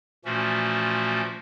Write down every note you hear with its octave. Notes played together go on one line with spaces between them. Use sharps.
A#2 E3 F3 A3 C#4 F#4